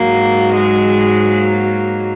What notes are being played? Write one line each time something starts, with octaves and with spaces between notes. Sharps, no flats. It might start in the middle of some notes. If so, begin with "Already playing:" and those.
Already playing: G#2 F#3 A#3
G#3
A#3